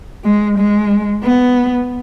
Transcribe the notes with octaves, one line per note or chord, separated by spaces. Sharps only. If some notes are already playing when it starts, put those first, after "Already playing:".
G#3
G#3
B3